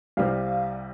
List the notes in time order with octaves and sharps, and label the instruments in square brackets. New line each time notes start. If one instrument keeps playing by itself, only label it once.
[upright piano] C2 C3 G3 [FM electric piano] F5